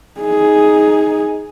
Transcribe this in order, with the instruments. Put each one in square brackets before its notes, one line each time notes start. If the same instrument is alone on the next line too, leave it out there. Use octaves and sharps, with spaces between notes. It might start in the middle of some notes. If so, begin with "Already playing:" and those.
[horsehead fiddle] D#4 G#4